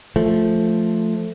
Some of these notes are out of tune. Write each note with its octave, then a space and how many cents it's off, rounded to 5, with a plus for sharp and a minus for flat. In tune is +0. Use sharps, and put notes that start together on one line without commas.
F3 +0 A3 +0